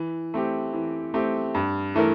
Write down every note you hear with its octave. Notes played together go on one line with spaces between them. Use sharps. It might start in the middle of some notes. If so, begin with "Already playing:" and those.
Already playing: E3
A3 C4 G4
E3
A3 C4 G4
G2
E3 A3 E4 A#4